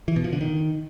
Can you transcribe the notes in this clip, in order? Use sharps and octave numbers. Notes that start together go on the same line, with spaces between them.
E3
B2
F3
D3
D#3